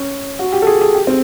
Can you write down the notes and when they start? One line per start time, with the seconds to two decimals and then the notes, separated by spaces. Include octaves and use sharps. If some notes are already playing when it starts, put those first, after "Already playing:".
Already playing: C#4
0.39 F#4
0.53 G4
0.62 A4
0.67 G#4
0.81 G#4
0.95 G4
1.07 C4